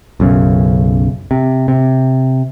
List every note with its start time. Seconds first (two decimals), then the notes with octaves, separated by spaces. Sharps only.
0.20 B1 F#2 C#3
1.31 C3
1.68 C3